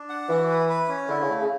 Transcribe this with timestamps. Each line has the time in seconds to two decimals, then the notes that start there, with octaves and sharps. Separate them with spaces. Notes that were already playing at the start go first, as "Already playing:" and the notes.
Already playing: D4
0.09 F#5
0.29 E3 F#4
0.49 B4
0.69 B4
0.88 C#4
1.09 D3 E4
1.21 C#3
1.29 A3
1.40 C#3